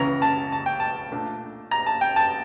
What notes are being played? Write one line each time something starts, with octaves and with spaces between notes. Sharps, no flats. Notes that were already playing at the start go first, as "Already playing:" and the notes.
Already playing: C#2 C#3 E3 A#5
A5
A5
G5
A5
A#2 A3 D4
A#5
A5
G5
A5